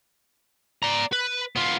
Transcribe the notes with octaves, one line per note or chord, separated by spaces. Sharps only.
D5 A#5
B4
B3 F4